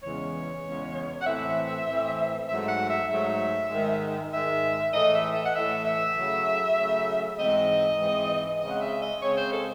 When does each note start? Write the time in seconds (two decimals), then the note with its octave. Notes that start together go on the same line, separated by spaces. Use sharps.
0.04 E2 C#3 E3 G#3 C#4 C#5
0.65 E2 C#3 E3 G#3 C#4
1.21 F#5
1.27 A2 E3 C4 E5
1.87 A2 E3 C4
2.49 G#2 F#3 A3 E5
2.69 F#5
2.89 E5
3.09 G#2 F#3 A3 E5
3.70 G#2 D#3 G#3
4.32 G#2 D#3 G#3 E5
4.93 A2 E3 A3 D#5
5.14 E5
5.34 E5
5.46 F#5
5.55 A2 E3 A3 E5
5.85 E5
6.16 C#3 F#3 A3
6.76 C#3 F#3 A3
7.38 G#2 E3 C4 D#5
7.99 G#2 E3 C4
8.60 C#3 G#3 C4 D#5
8.70 F#5
8.81 E5
9.02 D#5
9.22 C#3 G#3 C4 C#5
9.37 C5
9.52 A4